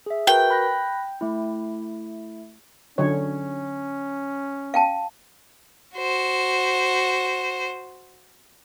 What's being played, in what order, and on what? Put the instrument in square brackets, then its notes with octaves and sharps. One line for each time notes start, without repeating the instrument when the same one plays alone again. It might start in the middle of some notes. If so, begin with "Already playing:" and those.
[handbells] G#4 E5
[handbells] F#4 A#4 B4 [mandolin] G5
[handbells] B5 F#6 A#6
A3 E4
[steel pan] D3 F#3 C#5 [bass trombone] C#4
[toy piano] F5 G5 A5
[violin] F#4 C5